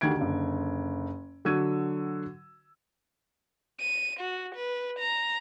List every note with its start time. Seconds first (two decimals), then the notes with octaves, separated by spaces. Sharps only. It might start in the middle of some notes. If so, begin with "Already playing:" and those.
0.01 D2 D#3 G4 G#6 D7
0.17 F#1 D3
1.45 D3 F#3 F#4 E6 G#6 D#7
3.80 D#7
4.20 F#4
4.55 B4
4.99 A#5